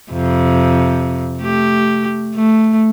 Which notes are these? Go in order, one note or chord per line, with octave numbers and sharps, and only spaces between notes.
F2 C3
A3 G4
A3